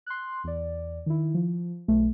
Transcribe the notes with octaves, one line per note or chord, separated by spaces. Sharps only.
C6 F#6
E2 D5
D#3 E4
F3
B1 A3